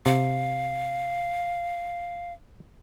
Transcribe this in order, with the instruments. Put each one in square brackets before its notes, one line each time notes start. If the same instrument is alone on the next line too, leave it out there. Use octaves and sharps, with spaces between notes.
[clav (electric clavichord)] C3 [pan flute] F5